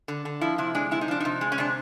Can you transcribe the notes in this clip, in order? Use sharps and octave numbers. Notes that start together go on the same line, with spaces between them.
D3
D3
F3 E4
C3 E4
G#3 D4
C3 E4
D#4
F3 D4
C3 D#4
G#3
C#4
C3 D4